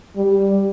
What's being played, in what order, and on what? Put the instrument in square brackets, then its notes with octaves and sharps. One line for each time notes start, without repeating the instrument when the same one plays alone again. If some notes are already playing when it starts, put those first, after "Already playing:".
[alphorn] G3